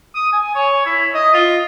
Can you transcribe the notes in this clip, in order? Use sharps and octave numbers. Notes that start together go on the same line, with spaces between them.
D#6
G#5
C#5
E4
D#5
F4